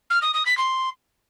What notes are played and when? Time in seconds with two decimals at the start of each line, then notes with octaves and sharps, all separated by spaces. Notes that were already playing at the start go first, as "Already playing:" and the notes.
0.10 F6
0.22 D#6
0.34 D#6
0.46 B6
0.58 C6